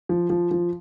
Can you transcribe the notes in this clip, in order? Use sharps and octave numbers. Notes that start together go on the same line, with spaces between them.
F3
F3
F3